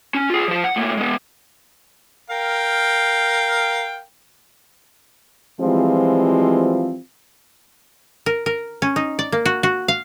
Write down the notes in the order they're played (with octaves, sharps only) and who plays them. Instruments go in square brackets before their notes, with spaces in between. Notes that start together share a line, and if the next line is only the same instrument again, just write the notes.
[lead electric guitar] C#4
F4 G#4
F3 C5
F#5
A2 A#3
G#3 B3
[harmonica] A#4 F5 G5
[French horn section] E3 F3 G3 G#3 C4 F4
[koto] A#4
A#4
C#4
D#4
D5
A#3
F#4
F#4
F5